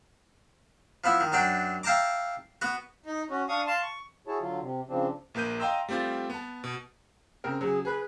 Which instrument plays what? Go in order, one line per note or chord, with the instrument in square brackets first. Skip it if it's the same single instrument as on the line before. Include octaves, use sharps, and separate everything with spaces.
[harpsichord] F3 B3 E4 E5
D#3
F#2 F#3 D4 D5 G5
E5 F5 G5 A5 A#5 D6
B3 F#4
[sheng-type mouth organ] D#4
C#4 F#4
D4 F5 C#6 D#6
F5 A5 C6
C#6
[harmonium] E4 F#4 G#4 C#5 A5
D3 F#3 F4
C3
C#3 F3 C4 D4
[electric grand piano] A#1 A#3 B4 G6 D#7
D#5 F5 G5 A#5 C6 E6
G3 A3 C4 F4 A6
B3 A5
B2
[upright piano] C#3 C4 A#4
[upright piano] C#3 F#3 [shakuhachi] G#4
[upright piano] G#4 [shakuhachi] B4